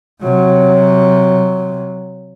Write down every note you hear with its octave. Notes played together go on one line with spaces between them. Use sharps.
C3 F#3